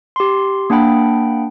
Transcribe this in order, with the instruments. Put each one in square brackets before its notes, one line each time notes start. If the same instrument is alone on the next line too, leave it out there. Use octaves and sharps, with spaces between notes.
[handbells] G4 C6
A#3 D4 F#5 G5 B5